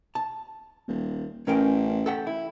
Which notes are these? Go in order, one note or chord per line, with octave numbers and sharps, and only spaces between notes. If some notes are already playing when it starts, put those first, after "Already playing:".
A5
D#1
A1 C#4 A#4 G5
A4 F#5 G5
E4